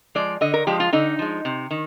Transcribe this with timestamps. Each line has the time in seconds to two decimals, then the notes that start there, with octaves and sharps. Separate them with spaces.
0.15 F3 G#3 D5
0.41 D3 D#5
0.54 A#4
0.67 F3 G#3 G4
0.80 F4
0.93 D3 D#4
1.19 F3 G#3
1.45 C3
1.71 D#3